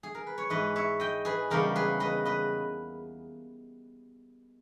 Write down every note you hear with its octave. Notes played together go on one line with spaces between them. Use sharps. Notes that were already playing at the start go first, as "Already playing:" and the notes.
G#4
A#4
B4
C#5
G#2 E3 G#3 B4 D#5
C#5 E5
D#5 G5
G#4 B4
E2 C#3 G3 A#3 D#4 G4 A#4
G#4 B4
B4 D#5
B4 D#5